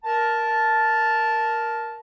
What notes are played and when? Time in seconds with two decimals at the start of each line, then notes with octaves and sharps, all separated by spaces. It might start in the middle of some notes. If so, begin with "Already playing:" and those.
0.04 A#4 A5